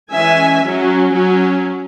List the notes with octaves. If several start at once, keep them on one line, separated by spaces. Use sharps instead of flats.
E3 G#3 C#4 E5 G#5
F#3 C#4
F#3 C#4